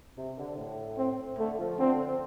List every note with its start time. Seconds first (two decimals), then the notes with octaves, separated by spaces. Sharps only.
0.17 C3
0.38 D3
0.58 A2
0.98 C4
1.39 D3 A3
1.59 F3
1.79 D3 C4